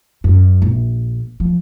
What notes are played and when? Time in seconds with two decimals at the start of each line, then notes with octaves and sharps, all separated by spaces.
0.24 F#2
0.62 A#1
1.40 F3